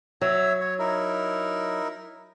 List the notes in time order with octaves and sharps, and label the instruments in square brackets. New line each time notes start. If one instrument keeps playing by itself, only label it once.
[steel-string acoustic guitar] F#3 [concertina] C#5 E5
[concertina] C#5
D#4 E4 A#4